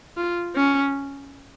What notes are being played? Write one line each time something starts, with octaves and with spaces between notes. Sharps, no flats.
F4
C#4